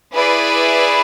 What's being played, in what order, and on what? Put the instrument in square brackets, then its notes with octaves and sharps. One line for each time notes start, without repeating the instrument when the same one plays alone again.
[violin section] E4 G#4 B4 D5